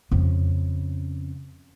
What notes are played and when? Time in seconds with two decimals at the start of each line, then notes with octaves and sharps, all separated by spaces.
0.11 F2 C#3